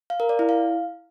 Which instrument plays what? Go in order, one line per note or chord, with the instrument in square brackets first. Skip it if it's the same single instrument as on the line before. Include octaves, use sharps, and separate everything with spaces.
[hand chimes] F5
A#4
D5
E4
F5